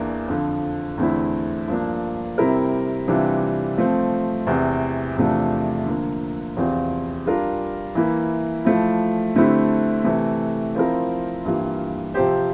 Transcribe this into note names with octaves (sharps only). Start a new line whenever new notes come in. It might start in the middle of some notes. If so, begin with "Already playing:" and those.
Already playing: E2 E3 A#3 D4
F2 D3 F3
E2 D3 A3 C4 E4
G2 F3 A#3 D4
C3 G3 C4 E4 A#4
C3 E3 G3 D4 F4
F3 A3 C4
E2 C3 E3
E2 C3 F3 A3 D4
D3 F3 A#3
E2 C3 F3 C4 F4
G3 D4 F4 A#4
E3 A#3 E4
F3 A3 E4
D3 A3 C4 E4 G4
C3 E3 A3
F3 C4 E4 A#4
G2 E3 G3 A#3 F4
C3 F3 C4 G4 C5